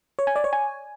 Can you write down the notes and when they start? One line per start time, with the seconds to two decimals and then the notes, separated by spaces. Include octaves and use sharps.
0.19 C#5
0.27 G#5
0.36 D5
0.44 C#5
0.53 G#5